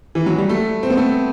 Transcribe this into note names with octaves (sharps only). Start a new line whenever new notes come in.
E3
F#3
G3
A3
C4
B3
A3